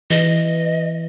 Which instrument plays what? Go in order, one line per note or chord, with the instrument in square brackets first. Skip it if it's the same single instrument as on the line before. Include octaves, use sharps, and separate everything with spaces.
[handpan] E3 [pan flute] D#5